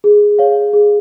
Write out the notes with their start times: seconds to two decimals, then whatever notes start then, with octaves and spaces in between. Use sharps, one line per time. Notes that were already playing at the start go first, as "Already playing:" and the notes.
0.04 G#4
0.39 C#5 F5
0.73 G#4